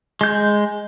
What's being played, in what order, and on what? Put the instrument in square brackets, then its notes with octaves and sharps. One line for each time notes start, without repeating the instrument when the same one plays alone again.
[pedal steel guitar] G#3 G6